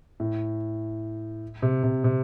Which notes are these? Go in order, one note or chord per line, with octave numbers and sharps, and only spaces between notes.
A2
C3
C3
C3